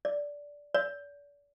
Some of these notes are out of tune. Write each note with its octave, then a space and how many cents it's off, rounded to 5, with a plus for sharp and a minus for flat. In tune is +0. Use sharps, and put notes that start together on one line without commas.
D5 -10
D5 -35